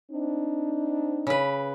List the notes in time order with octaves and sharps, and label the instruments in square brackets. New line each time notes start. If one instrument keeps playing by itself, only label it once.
[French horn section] C4 D4 D#4
[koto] C#3 B4